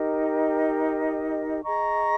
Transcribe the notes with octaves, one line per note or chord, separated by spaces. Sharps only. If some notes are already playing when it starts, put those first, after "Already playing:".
Already playing: D#4 G4 A#4 D#5
G#4 D#5 A#5 C#6